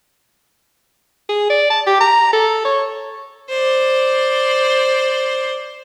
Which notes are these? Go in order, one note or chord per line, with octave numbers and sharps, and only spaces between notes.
G#4
D5
A5
G4
A#5
A4
C#5
C5 D5